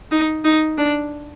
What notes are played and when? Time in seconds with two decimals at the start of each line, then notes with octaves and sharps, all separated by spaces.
0.11 D#4
0.44 D#4
0.78 D4